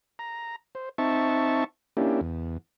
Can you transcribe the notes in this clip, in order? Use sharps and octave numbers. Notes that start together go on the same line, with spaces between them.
A#5
C5
C4 D#4 E5 A5 C#6
A#3 C#4 D4 E4 G4
E2